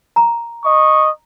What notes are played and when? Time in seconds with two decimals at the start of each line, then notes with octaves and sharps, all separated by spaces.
0.16 A#5
0.64 D#5 C#6